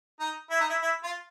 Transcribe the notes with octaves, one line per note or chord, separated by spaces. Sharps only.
D#4
E4
D#4
E4
E4
F4